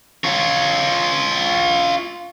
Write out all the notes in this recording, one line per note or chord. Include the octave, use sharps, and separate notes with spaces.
F4 C#5